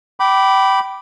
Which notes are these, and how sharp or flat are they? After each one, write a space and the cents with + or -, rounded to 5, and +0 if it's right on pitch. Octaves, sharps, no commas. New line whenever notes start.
G5 -25 B5 +0 D6 +0